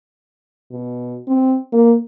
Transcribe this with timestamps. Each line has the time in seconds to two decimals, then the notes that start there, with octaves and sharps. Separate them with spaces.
0.71 B2
1.27 C4
1.73 A#3